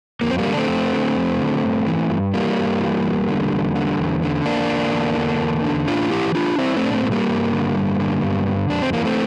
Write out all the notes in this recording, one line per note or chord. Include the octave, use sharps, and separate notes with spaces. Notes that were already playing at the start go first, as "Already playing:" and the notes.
F2 A#3
C4
G3 A#3
D3
D4
A3 C4
F2
D3
F2
D3
G2
E3
G2
E3 G3 A#3
G2
E3
E2
D3
E2
D3
E2
D3
E2 A#3 D4
D3
E2
D3
E2
D3
A2 D4 F4
E3 E4 G4
A2 D4 F4
E3 C4 E4
A3 C4
A2 D4
A3 C4
E3 A3
G3 A#3
G2
D3
G2
D3
G2
D3
F2 D4
C4
E3 A#3
A3 C4